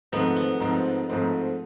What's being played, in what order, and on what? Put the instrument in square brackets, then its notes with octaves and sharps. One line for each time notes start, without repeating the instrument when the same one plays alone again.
[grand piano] G#2 F3 A3 C4 D#4 [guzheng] B3
[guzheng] B3
[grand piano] G#2 F3 A3 C4 D#4
G#2 F3 A3 C4 D#4